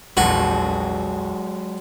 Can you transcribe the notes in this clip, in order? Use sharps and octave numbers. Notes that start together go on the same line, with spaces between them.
A#1 E2 F#3 G#3 F#4 B4